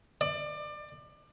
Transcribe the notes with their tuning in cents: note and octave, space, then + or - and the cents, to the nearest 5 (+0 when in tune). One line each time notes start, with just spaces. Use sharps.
D5 +25